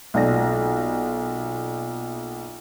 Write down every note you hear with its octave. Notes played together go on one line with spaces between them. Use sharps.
B1 A#2 D5 A#6